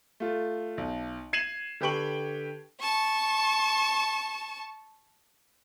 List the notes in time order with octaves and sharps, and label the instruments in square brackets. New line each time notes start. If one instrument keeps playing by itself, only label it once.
[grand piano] A3 F4
B1
G#6 C7 D#7 E7 F#7
D3 G4 B4 G5 C#6 F#7
[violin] A5 C#6